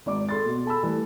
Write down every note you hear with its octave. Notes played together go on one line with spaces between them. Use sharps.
G#1 D5 D6
A4 C6 A6
B2
A4 A5 B5 E6
E3 G3 A3